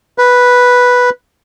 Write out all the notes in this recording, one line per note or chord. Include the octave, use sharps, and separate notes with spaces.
B4